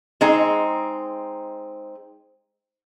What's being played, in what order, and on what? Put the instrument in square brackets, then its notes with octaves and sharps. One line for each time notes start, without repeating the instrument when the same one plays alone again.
[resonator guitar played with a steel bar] G#3 C4 D#4